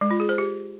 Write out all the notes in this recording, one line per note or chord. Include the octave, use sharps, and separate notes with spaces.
G#3
F4
G#4
C5
G4